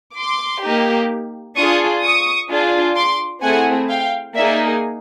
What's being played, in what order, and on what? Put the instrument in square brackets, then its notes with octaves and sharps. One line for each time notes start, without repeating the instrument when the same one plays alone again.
[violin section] C6 D6
A#3 D#4 G4
D4 F4 G#4 C#6 D#6
C#6 D#6
D4 F4 G#4
C6 D6
A3 C4 E4 G#4 F#5 G#5
F5 G5
A#3 D#4 G#4 D5 E5